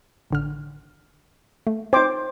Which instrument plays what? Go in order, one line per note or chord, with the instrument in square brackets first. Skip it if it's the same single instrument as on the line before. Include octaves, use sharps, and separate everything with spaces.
[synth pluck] A1 D3 F6
A3
[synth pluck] C4 D#4 [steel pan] C5 D6